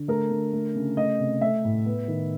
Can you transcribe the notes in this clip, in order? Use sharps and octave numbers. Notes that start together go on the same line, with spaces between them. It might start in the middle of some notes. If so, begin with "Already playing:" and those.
Already playing: D3
A3 A#4
D3
A3
C#3
A3 D#5
C3
A3 E5
A2
B3
D#3